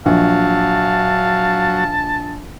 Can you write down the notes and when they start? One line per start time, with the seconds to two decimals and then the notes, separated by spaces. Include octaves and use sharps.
0.06 A#1 F#3 F5 A5